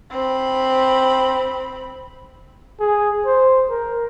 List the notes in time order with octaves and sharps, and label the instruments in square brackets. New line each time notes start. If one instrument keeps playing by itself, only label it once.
[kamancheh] C4 B5
[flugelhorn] G#4
C5
A#4